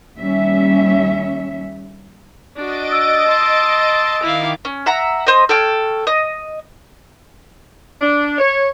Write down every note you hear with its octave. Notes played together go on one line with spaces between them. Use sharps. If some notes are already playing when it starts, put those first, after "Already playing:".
D#2 G3 C#4 E5
D4 F#4 D#5 A6 D7
E6
A5 C6
D#3 E4 F5 D6
C#4
E5 F#5 A#5
C5 D#5
A4 C#5 G5 F6
D#5
D4
C#5